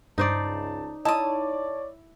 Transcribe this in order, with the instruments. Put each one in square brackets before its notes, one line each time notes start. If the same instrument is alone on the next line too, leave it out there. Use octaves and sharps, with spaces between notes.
[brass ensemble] C#2 A5 [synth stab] G2 [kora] D#4 C5 D5
[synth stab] D#4 [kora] E4 [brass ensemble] C#5 D5 [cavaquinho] A5 D#6